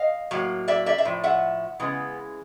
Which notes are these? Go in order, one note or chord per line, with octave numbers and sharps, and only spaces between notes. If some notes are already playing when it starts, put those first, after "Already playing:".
Already playing: D#5 F5
A2 F#3 A#3
D5 E5
D5 E5
E5
A2 F3
E5 F#5
C#3 E3 G#3 B3